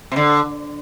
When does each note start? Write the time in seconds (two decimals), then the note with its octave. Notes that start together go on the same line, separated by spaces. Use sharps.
0.12 C3
0.16 D3